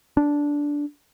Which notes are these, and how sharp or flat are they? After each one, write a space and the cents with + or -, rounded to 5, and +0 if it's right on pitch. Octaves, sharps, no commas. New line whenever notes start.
D4 -10